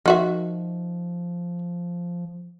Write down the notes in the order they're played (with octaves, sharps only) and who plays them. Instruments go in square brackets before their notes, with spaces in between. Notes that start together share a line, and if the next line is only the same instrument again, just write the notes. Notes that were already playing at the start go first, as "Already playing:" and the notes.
[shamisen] D#3 F#4 E5 [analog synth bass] F3